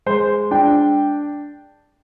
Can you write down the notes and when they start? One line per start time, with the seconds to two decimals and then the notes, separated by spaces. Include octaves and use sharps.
0.06 G#3 C5
0.51 D4 G5